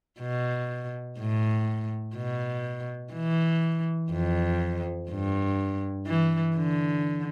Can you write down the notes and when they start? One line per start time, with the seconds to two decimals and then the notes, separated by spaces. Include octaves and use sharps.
0.20 B2
1.19 A2
2.17 B2
3.14 E3
4.12 F2
5.10 G2
6.07 E3
6.57 D3